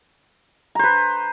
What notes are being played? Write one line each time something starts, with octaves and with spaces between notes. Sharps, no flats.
B4 C5 A#5